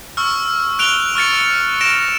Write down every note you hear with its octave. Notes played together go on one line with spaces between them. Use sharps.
C#6 E6 F6
F#6 D7 F7 G7
C#6 F6 A6 C#7
A#6 D7 E7